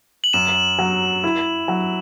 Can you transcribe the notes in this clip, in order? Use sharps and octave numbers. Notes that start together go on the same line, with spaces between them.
F#7
F#2 E7
F#3
E4
F#3